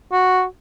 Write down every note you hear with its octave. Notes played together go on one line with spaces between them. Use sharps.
F#4